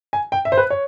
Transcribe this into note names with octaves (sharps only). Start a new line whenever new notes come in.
G#5
G5
E5
C5
B4
C#5